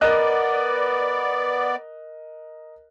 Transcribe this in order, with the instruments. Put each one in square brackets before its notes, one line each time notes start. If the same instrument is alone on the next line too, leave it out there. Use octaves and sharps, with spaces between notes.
[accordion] B3 D5 [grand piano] A#4 D#5 F#6